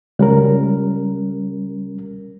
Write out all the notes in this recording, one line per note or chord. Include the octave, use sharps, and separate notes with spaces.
C#2 G3 C#4 A#4